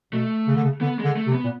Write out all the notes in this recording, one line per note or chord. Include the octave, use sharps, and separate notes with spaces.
B2 A3
C#3
D3
C#3
D3 B3
G#3
D3
A3
C3
B3
A#2